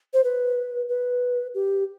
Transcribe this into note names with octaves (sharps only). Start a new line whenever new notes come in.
C5
B4
B4
G4